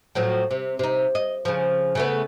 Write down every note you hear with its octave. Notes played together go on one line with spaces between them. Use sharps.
A2 F3 F#3
C3
C3 D#4
D#5
C#3 F3
C#3 A3 B3